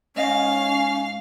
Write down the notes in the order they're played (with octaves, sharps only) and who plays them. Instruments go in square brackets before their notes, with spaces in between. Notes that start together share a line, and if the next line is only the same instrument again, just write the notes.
[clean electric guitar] G#2 D#5 [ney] C#4 [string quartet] F5